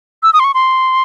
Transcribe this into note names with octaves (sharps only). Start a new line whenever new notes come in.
E6
D#6
C6
C#6
C6